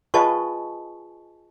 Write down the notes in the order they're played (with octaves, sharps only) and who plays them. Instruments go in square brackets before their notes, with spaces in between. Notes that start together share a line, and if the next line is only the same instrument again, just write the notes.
[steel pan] F4 G#4 B4 [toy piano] D#5 A5 C#6